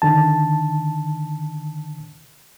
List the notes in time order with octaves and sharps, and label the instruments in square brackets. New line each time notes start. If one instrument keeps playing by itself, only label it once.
[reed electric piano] D3 D#3 A5